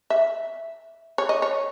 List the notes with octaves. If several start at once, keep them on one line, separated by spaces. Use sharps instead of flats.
E5
C#5
D#5
C#5